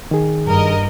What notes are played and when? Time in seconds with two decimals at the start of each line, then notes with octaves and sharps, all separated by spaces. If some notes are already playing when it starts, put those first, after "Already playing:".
0.11 D#3 G#4
0.47 G2 A#4 D#5